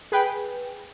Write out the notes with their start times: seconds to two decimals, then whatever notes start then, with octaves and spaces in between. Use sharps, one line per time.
0.12 G#4 B4 G5